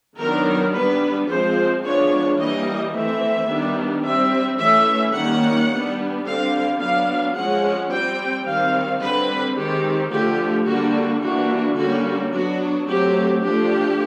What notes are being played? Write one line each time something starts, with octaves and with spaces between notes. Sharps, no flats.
D#3 F#3 B3 D4 A#4
G3 B3 D4 B4
F3 G#3 C4 C5
F3 G#3 B3 D4 C#5
E3 G3 A#3 D#5
E3 A3 C4 E5
D#3 G3 B3 D4
G3 C4 E5
E3 A3 C#4 E5
D#3 G3 A#3 C#4 F#5
G3 B3 D4
D3 G3 C4 F5
F#3 B3 D4 F5
F3 G#3 C#4 F#5
G3 C4 G5
D#3 G3 C4 F5
D3 G3 C4 B4
D#3 G#3 C4 G4
D3 F3 A3 G4
D3 G3 A#3 D4 F#4
E3 G3 A#3 D4 F#4
D3 G3 A#3 C#4 F#4
F#3 B3 D4 F#4
F#3 A3 C4 G4
F3 A3 D4 G4